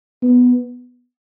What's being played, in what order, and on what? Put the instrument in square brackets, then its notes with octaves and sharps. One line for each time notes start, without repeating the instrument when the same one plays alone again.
[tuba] B3